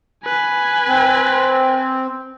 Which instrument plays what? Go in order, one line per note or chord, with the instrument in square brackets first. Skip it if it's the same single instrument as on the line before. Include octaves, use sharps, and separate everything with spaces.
[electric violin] B4 G#5
[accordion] C4